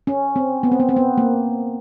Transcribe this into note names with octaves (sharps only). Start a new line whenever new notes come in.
C#4
C4
B3
C4
B3
C4
B3
A#3